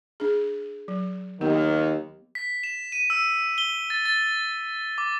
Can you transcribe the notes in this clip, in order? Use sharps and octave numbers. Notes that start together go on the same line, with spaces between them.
D4 G#4
F#3
D#2 D#3 B3 G4
B6
E7
D#7
E6
G7
A6
A6
D6